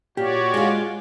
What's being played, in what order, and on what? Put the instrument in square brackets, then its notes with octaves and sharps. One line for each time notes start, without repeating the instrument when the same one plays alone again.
[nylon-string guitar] A#2 [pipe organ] F#4 C#5 D5 [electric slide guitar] G4
[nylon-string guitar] G#3 F4